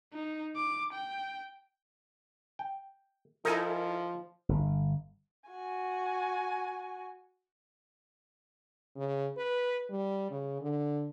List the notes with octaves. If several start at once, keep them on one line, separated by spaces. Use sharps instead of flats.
D#4
D6
G5
G5
F3 D#4 E4 A4 A#4 G#5
G1
F#4 G#5
C#3
B4
G3
C#3
D3